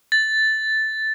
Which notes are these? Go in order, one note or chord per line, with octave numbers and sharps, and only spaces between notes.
A6